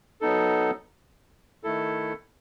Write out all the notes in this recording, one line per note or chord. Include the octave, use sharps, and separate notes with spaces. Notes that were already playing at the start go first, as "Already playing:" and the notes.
F#3 B3 D#4 A4
D#3 A3 E4 A4